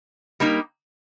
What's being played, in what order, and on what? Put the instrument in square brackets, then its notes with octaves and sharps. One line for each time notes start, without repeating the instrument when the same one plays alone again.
[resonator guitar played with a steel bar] G3 A#3 D#4